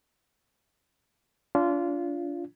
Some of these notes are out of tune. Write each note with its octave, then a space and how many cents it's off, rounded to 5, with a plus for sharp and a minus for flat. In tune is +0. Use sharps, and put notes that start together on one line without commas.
D4 -35 F4 -15